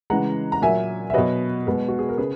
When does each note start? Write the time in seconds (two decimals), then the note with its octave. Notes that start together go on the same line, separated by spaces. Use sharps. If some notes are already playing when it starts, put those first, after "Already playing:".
0.10 C#3 E3 G#3 F#5 A#5
0.52 A#5
0.62 A#2 F#3 E5 G#5
1.10 E5
1.14 B2 F#3 B4 D#5
1.67 B2 G#3
1.88 F#4
1.99 G#4
2.09 A#4
2.18 C#3 G#4 B4